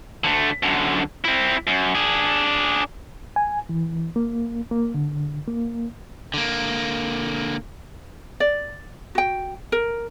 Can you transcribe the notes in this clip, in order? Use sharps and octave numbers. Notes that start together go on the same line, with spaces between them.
D3 A3
F#2 D3
C4 E4
F#2
D4 G#4
G#5
E3
A#3
A#3
D3
A#3
D3 A#3
D5
F#4 G5
A#4